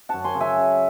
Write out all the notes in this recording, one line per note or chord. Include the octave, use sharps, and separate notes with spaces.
F#2 F#5 A5
G#5 C6
C#3
E5 G#5
C#3